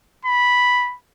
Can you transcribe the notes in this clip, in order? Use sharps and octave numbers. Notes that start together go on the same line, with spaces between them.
B5